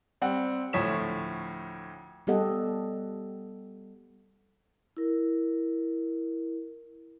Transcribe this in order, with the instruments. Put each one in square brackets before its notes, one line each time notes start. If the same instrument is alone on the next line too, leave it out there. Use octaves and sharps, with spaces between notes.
[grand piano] G3 C4 F#5
D2 A2 F3 C#5 B6 E7
[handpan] G3 B3 G4 A4 D#5 F#5
[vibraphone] E4 A#4